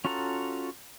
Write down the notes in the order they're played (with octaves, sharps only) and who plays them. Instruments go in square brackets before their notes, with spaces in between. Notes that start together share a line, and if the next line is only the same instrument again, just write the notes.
[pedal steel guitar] C#4 F4 F#4 A4 A#5